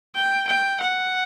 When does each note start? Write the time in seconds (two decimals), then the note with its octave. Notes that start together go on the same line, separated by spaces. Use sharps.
0.15 G5
0.48 G5
0.81 F#5